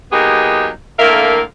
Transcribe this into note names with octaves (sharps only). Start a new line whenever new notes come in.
F#3 A#3 B3 D#4 G4 G#4
A2 D3 A#3 A#4 E5 F5